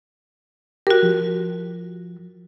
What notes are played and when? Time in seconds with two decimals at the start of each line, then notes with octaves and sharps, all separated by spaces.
0.87 F#4 G4 A#4
1.03 F3